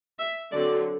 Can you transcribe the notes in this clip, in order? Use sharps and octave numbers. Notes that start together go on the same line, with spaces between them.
E5
D3 F#3 C4 D5